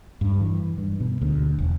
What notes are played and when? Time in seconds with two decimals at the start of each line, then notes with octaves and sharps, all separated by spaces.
0.21 G2
0.41 E3
0.78 G2
1.00 B2
1.21 D2
1.59 E1